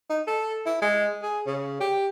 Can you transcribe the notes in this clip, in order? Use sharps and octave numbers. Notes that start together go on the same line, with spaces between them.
D#4
A4
E4
G#3
G#4
C#3
G4